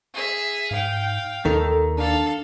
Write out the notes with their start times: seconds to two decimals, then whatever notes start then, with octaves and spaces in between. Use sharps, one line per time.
0.14 G#4 E5
0.71 G#2 F5 G5
1.45 D#2 D#3 A4
1.97 D4 A4 F5